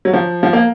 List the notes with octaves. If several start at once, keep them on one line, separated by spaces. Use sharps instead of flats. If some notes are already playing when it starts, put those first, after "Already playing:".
F#3
F3
F3
A#3